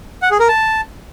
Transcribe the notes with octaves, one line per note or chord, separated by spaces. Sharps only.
F#5
G#4
A#4
A5